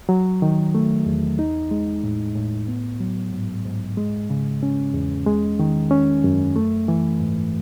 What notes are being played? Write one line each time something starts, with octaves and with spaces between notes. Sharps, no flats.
F#3
D#3
A3
E2
D#4
G#3
A2
A2
B3
F#3
G#2
G#2
G#3
C#3
C#4
E2
G#3
D#3
C#4
F#2
A3
E3
G#2